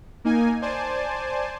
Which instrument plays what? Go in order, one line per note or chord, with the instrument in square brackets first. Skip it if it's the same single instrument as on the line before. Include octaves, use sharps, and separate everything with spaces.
[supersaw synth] A#3 D#4 G#5
C5 D5 G#5 A5